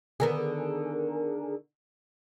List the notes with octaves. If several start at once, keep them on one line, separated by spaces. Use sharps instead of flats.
D3 D#3 B3 G#4 A#4